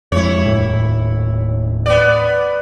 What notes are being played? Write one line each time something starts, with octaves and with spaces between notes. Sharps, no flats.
F2 G#3 E4 C#5
D#1 D#2 A2
B3 D5